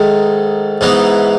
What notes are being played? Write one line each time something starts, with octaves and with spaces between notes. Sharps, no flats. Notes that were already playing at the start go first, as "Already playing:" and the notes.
Already playing: G#2 D#3 A3
G#2 E3 B3 D#4